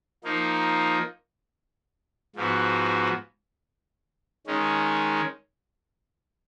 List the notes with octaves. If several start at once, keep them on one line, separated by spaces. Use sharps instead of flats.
F3 A#3 D#4
G#2 F3 B3 F#4
D#3 G#3 C#4